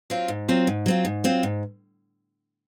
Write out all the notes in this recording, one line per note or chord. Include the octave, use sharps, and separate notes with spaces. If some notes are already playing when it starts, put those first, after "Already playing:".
F#3 C4 F4
G#2
F#3 C4 F4
G#2
F#3 C4 F4
G#2
F#3 C4 F4
G#2